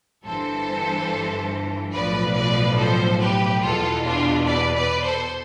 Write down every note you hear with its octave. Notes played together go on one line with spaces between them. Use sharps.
G1 G2 E3 A4 C5
B1 A2 F3 B4 D5
B4 D5
A4 C5
G4 B4
E2 B2 F4 A4
D4 F4
B4 D5
B4 D5
A4 C5